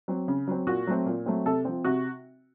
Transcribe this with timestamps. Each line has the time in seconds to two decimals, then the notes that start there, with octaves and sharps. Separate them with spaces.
0.08 F#3 C4
0.28 C#3
0.48 F#3 C4
0.67 A#2 F#4
0.87 F#3 A3 C4
1.06 A#2
1.26 F#3 A3 C4
1.46 C3 A4
1.65 F3 C4
1.84 C3 F#4